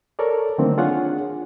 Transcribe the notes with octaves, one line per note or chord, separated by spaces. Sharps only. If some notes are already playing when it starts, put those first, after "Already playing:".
A4 A#4 C#5 D5
D3 D#3 F#3 A3 A#3 C4
D4 F4 G#4 C#5 F#5